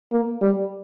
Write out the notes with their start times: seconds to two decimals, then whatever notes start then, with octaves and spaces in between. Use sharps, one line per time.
0.12 A#3
0.41 G3